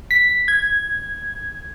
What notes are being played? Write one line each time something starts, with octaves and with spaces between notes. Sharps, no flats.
B6
G#6